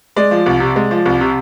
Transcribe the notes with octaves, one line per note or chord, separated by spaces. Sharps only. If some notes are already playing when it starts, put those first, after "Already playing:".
G#3 D5
F3
C2
C3
G#3
F3
C2
C3